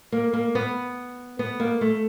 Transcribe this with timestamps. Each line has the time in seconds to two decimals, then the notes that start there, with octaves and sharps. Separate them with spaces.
0.12 A#3
0.33 A#3
0.55 B3
1.39 B3
1.60 A#3
1.81 A3